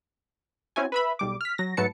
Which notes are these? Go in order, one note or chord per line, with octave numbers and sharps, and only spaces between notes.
C4 C#4 E4 F#4 G#5
B4 E5 B5
B1 G3 D6
F6 B6
F#3 A#6
G#2 F#3 A3 B4 A5 C#7